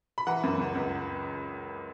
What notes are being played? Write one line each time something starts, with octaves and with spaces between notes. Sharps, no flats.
B5
E3 F#5 A#5
F#2
C#2
C#2